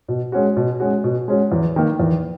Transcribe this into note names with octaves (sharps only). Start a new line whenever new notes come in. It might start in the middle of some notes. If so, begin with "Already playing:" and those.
B2
G#3 C#4 F#4
B2
G#3 C#4 F#4
B2
G#3 C#4 F#4
E2
D#3 A#3
E2